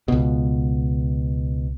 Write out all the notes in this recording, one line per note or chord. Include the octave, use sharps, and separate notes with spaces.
C#2 B2